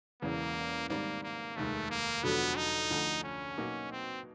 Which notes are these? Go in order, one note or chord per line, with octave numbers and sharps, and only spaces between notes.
E1 E2 C#3 E3 A#3
G#2 D#3 G3 A#3 C4
A#3
F1 D#2 D#3 G#3 A3
A#3
F1 F2 D3 F#3 B3
D#4
D2 D3 F3
C#4
B2 F#3 A#3 D#4 F#4
C4